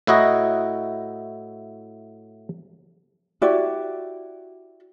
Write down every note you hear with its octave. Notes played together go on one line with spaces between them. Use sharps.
A2 E4 F#4 D#5 A#5
E4 F#4 G4 D5